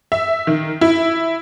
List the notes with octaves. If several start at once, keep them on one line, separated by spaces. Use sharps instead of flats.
E5
D#3
E4